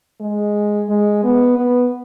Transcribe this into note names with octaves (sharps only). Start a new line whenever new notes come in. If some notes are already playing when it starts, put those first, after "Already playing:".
G#3
G#3
B3
B3